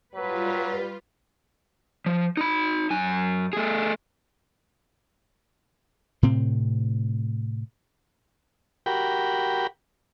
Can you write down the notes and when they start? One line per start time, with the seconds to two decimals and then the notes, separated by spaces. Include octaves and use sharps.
0.15 F#3 G3 F4 B4
2.06 F3
2.37 D#4 B5
2.90 F#2 G#5
3.53 A3 G#4
6.23 A2 C3 C4
8.86 F#4 G4 A#4 G5 B5